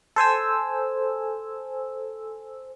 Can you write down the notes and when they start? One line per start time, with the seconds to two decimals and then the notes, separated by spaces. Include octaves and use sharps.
0.16 A4 C5 G#5 E6